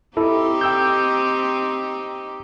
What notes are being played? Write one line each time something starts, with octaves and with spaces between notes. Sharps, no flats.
C4 D#4 E4 G4 A4
G5 E6 G6